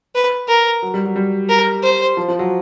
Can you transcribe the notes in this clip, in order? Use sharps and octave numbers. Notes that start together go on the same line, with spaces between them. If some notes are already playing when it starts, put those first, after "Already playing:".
B4
A#4
F#3
G3
F#3
G3
A#4
C5
F3
F3
F#3